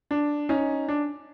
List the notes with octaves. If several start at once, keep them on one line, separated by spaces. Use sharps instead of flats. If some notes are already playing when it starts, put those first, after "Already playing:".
D4
C#4 D#4
D4